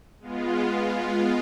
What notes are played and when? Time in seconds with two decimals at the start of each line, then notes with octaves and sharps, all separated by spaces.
0.20 G#3 B3 F4